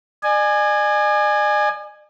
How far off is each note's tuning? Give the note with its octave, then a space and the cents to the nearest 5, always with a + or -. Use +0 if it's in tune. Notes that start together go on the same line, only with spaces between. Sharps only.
D5 +45 G#5 +0